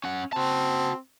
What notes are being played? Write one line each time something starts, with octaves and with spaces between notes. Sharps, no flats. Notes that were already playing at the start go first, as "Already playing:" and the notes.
C#4 F#5
C4 F#4 A5